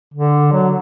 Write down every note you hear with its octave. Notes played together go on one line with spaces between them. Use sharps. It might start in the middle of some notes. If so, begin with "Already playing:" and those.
D3
F#3